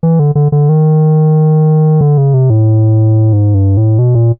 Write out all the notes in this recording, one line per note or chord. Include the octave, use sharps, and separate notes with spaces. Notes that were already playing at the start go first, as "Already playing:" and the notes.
E3
D3
D3
D3
D#3
D3
C#3
C3
A2
G#2
G2
A2
B2
A#2